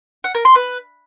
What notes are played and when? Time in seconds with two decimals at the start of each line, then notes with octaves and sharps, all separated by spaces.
0.24 F#5
0.35 A#4
0.45 C6
0.55 B4